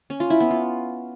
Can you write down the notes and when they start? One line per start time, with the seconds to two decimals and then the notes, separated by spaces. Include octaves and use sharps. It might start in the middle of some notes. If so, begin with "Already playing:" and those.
0.10 C#4
0.20 F4
0.30 E4
0.40 B3
0.51 F4